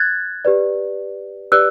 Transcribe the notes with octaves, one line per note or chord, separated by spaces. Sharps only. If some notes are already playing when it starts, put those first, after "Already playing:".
Already playing: F#6 G#6 A6
G4 B4 D5
G4 B4 D5 E6 F#6